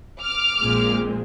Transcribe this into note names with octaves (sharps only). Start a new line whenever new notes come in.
D6 F6
A#1 A#2 F3 G#3 C4